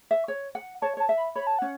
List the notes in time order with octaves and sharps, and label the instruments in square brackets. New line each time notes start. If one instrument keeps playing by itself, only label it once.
[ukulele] E5
C#5
F#5
[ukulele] C#5 [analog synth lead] A5
[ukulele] C#5 [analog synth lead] A5
[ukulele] E5
[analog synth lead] B5
[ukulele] C#5 [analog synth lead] B5
[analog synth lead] A5
[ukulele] C#4 [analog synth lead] F#5